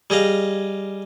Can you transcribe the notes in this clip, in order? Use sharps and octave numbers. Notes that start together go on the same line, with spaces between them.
G3 G#4 D#5 F5